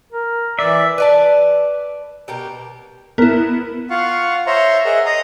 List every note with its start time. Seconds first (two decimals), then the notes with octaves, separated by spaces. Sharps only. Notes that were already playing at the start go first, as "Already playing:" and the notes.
0.13 A#4
0.59 E3 D5 E5
0.98 B4 D5 A5
2.28 B2 G4 A#4
3.18 B3 E4 A#4
3.90 F4 F5 F#5 C#6
4.47 C5 C#5 E5 A#5 C6
4.85 G#4 A#4 D#5 E5 F#5
5.06 D#5 A#5 D#6